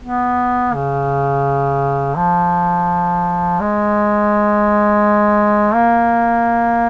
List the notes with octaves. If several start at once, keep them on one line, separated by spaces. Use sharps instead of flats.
B3
C#3
F3
G#3
A#3